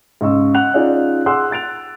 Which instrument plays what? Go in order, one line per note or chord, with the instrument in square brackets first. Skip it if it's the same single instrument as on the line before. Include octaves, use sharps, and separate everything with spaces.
[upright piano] G#2 C#3 D#5 C#6 E6
F#5 F#6 F7
C#4 D#4 F4 G#4 D5
G#4 F#5 C6 D6 E6 F#6
F#6 A6 D7 F7